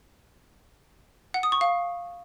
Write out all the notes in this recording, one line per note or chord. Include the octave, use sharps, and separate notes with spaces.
F#5
D#6
C#6
F5